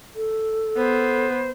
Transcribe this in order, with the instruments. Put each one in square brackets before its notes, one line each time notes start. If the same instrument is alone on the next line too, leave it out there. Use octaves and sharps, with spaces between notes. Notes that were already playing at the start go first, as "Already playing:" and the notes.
[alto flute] A4
[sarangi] B3 [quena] C5